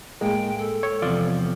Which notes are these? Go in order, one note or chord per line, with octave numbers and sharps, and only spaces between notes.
A2 G#3 A#3 G5
A4
C#5
E2 C3 F3 F4 D5